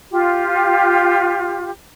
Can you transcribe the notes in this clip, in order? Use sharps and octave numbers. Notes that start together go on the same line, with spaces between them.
F4 G4